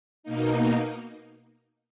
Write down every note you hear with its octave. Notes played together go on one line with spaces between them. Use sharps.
B2 A#3 D#4